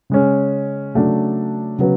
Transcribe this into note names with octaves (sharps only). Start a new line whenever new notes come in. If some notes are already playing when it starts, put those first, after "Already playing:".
C#3 G#3 C#4
C#3 F#3 A3 D4
C#3 F#3 B3